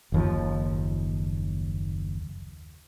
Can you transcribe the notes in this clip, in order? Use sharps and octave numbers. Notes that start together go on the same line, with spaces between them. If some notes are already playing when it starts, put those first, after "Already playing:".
F#1 D#2 F3